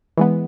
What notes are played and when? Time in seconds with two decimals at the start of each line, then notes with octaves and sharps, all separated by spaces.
0.17 E3 G#3 B3